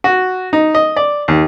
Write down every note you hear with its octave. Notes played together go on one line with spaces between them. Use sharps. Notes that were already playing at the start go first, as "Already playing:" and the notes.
F#4
D#4
D#5
D5
D#2